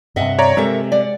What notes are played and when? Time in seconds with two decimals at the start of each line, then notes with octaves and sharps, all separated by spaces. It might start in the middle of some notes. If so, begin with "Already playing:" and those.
0.16 G2 C3 D#5 E5 F#5
0.39 C#5 D5 A#5
0.57 C3 G#3 A4 A#4 E5
0.92 D5 F#5